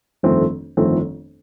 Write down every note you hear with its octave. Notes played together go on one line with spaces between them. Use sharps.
G1 F2 D#3 A3 C4
G1 F2 D#3 A3 C4